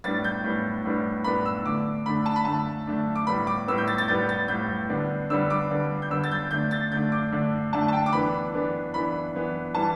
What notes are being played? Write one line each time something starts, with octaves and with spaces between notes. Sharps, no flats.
A2 G3 B3 D4 A6
G6
A2 G3 B3 D4
A2 G3 B3 D4
A2 G3 B3 D4 B5
E6
D3 A3 D4 D6
D3 A3 D4 B5
A5
B5
D3 A3 D4 A5
D3 A3 D4
D6
A2 G3 B3 B5
D6
A2 G3 B3 E6
G6
A6
A6
A2 G3 B3 G6
A6
A2 G3 B3 G6
D3 G3 B3 D4
D3 G3 B3 D4 E6
D6
D3 G3 B3 D4
G6
D3 G3 B3 D4 E6
A6
G6
D3 A3 D4 G6
A6
D3 A3 D4 G6
D6
D3 A3 D4
D3 A3 D4 A5
A5
G5
D6
E3 B3 D4 B5
E3 B3 D4
E3 B3 D4 B5
E3 B3 D4
E3 G3 B3 A5